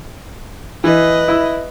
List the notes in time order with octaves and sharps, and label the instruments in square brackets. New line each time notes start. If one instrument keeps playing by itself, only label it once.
[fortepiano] E3 [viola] B4 D#5
[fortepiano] E4 E6